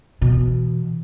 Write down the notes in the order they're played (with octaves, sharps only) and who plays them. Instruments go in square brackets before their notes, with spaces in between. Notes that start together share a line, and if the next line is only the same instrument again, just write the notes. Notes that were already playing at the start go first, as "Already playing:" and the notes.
[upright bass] B2 E3